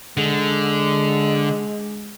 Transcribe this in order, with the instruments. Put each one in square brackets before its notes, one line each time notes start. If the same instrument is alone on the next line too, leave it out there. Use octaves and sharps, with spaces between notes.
[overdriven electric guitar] D3 [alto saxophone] G#3